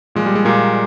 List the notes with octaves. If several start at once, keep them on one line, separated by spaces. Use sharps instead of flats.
A#2 F3 G#3
G3
G#3
A#2 A#3